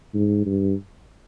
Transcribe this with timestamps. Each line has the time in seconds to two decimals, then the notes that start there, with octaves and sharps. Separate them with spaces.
0.15 G#2
0.46 G2